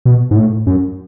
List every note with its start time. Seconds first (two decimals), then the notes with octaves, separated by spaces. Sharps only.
0.05 B2
0.31 G#2
0.36 A2
0.67 F#2